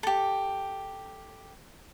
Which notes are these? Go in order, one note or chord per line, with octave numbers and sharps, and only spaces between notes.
G4 A4